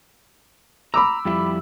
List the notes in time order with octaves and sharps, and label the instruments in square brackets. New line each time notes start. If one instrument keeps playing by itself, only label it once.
[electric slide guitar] A#5 [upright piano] B5 D6 E6
[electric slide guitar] F2 G3 E4